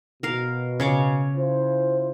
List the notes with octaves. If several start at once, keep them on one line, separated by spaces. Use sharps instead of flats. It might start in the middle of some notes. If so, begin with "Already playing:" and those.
B2 A#4 F5
C#3 C#5 D6
E4 F4 C5